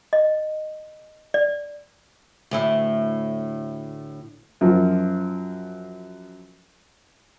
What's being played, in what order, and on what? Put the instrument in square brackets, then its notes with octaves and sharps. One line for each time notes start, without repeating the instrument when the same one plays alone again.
[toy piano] D#5
D5
[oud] D2 A2 E4
[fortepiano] F#2 F3